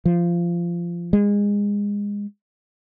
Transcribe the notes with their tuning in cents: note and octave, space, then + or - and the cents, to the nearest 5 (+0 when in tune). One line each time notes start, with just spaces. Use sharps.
F3 -20
G#3 -25